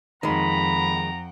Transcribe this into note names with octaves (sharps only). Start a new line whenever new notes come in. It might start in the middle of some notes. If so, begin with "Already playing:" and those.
F2 D#3 G#3 F#5 G5 A#5 B5